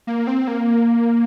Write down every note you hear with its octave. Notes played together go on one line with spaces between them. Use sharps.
A#3
C4
A#3